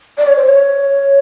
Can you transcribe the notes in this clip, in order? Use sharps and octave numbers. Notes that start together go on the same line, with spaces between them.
D5
C#5
C5
C#5